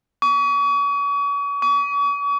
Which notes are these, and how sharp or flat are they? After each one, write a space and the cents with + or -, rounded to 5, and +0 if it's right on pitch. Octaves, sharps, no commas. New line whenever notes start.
C#6 +40
C#6 +45